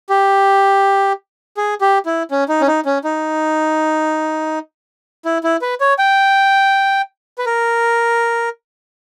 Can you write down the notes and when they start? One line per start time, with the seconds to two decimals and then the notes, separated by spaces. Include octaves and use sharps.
0.09 G4
1.57 G#4
1.81 G4
2.06 E4
2.31 C#4
2.49 D#4
2.61 C#4
2.68 D#4
2.85 C#4
3.04 D#4
5.25 E4
5.44 E4
5.62 B4
5.81 C#5
5.99 G5
7.38 B4
7.46 A#4